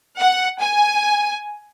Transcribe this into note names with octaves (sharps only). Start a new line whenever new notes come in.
F#5
G#5